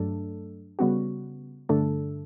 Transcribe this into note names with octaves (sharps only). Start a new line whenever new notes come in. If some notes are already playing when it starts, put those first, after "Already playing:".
Already playing: G2 F#3 A3 D4 A4
C#3 G3 B3 F#4
G2 D3 A3 D4 A4